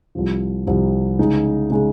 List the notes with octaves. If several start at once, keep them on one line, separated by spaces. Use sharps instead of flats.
C2 C3 F3
C2 C3 F3
C#3 G#3 D#4
C#3 G#3 D#4